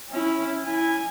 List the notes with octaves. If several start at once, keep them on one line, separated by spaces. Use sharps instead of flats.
C#4 E4
E4 G#5